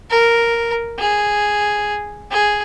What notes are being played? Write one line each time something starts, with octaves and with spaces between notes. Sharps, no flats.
A#4
G#4
G#4